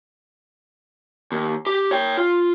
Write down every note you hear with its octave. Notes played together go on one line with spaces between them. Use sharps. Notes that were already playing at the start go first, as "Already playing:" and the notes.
D#2
G4
C#5 G5
F4